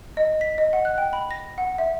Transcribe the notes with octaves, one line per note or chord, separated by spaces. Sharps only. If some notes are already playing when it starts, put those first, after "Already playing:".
D#5
B6
D#5
F#5
F#6
G5
B5
A#6
F#5
E5